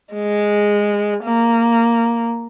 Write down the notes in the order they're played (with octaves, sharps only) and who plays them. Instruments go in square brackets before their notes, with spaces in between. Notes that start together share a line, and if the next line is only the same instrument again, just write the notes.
[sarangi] G#3
A#3